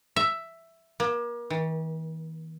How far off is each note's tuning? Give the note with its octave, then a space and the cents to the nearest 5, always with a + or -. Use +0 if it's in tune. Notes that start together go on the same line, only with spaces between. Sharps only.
E5 +5
A#3 +35
E3 -45